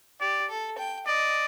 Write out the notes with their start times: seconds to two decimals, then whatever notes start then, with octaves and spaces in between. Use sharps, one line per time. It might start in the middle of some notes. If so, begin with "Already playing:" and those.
0.20 G4 D5
0.49 A4
0.78 G5
1.06 D5 D#5